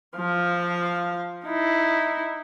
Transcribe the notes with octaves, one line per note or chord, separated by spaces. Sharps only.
F3 F5
D#4 E4